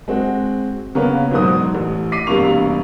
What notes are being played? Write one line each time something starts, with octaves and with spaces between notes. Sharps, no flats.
G#3 C4 F#4
C#3 A#3 B3 A#4 C#5
E1 G#2 B2 F#3 C5 D#6
A1
D6 B6 C7 D#7
E1 G2 C3 A#3 C#6 F7